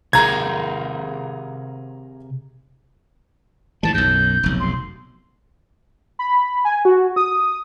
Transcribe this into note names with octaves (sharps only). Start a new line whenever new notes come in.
C3 G#4 A#4 A#5 G#6
G#2 E3 G3 A5
B1 F#2 G6
F1 B1
C6
B5
G#5
F#4
D#6